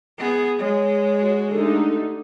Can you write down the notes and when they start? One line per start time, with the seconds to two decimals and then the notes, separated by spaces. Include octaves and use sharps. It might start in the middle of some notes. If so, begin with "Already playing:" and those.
0.18 B3 G#4
0.59 G#3 C#5
1.21 F#4
1.52 D3 A3 D#4 G4